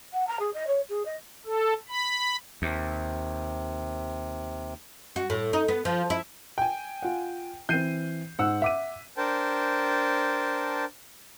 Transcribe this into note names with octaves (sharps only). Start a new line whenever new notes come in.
F#5
A#5
G#4
D#5
C#5
G#4
D#5
A4
B5
D#2 C3
F#4
A2
D#4
B3
F3
E4
G5 G#5
F4 F#5
E3 C4 G6 C7 D#7
G#2 F#5 E6
E5 F#5 D6 D#7
D4 A#4 C5 G5 A5